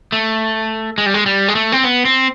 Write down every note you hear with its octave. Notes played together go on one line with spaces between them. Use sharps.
A3
G#3
G3
G#3
G3
G#3
A3
C4
B3
C4